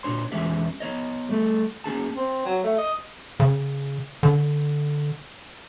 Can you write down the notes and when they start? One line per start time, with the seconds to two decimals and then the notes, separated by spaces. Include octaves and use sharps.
0.03 A#2 D4 C#5 C6
0.32 E2 E3 G#3 C#4 G4 E5
0.80 B3 C#5 D#5
1.29 G3 A3 A4
1.84 A#3 C#4 G#4 A5
2.16 C4
2.45 F#3
2.64 A3
2.78 D#5
3.40 C#3
4.23 D3